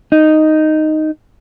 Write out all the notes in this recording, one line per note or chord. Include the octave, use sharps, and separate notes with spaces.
D#4